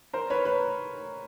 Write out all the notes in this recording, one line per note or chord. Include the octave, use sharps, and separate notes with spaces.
A#4 C5
B4 C#5
B4 C#5